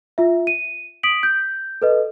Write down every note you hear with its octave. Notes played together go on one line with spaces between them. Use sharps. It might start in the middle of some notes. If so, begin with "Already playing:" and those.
F4 E5
D#7
D#6 B6 D7 F#7
G6
A4 B4 D#5